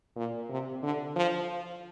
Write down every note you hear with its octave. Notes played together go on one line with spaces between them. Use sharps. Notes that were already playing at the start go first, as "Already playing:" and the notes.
A#2
C3
D3
F3